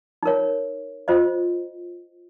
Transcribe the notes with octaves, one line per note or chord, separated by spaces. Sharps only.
D#4 A#4 C#5
F4 C5 D#5